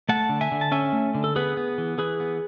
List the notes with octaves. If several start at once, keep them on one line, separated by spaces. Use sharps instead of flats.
A3 F#5 A5
D3
E5 G#5
D3
A5
C#4 E5 G#5
A3
D3
A4
B3 G#4 B4
B3
E3
E3 G#4 B4
B3